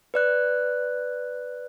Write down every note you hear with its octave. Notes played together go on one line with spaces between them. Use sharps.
B4 D5 F#6